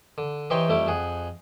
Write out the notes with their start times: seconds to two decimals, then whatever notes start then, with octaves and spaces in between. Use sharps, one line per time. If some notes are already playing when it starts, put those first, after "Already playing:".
0.18 D3
0.50 E3 D#4 G4 C5 C#5 G5
0.69 F2 G3 A3 E4 D6
0.87 F2 G#4 F#5